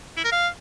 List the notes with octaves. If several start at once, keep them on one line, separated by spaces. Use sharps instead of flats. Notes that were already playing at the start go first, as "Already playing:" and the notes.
E4
A#4
F5